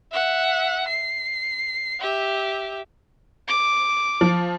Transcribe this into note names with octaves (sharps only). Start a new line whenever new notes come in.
E5 F#5
C7
G4 E5
D6
F3